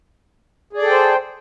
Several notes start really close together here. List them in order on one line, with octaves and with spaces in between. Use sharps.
G#4 D5 A4 G5 C5